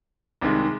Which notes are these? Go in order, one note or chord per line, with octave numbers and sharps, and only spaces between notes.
C2 C3 D#3 G#3